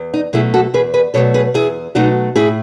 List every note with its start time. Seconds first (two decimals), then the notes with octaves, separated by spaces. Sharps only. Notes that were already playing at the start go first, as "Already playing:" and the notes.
Already playing: E2
0.14 D#4
0.33 B2 F#3 A3 E4 G#4
0.54 F#4 A4
0.74 E2 G#4 B4
0.94 G#4 B4
1.14 B2 F#3 A3 A4 C#5
1.34 G#4 B4
1.54 E2 E4 G#4
1.95 B2 F#3 A3 D#4 F#4
2.35 A2 E4 G#4